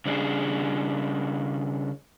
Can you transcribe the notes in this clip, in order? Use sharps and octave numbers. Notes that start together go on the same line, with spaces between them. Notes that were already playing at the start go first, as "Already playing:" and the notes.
C#3 G3 D4 G#4